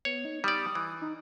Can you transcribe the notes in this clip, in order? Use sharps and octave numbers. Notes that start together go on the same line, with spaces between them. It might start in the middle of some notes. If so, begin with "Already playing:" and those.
B3 C#5
D#4
G3 D5 D#6
E3
D#4